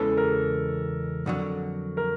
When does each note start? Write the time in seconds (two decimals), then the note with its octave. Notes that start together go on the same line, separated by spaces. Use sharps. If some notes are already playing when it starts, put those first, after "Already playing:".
Already playing: E2 C#3 E3 G#3 C#4 A4
0.17 A#4
1.26 F2 D3 F#3
1.97 A#4